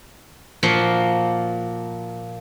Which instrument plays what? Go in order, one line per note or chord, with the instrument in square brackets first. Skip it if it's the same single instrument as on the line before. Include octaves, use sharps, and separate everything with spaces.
[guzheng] A#2 F3 A#3 F#4